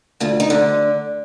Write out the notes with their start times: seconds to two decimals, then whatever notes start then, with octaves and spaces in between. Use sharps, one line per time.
0.20 D2 F4
0.40 D#4
0.50 D3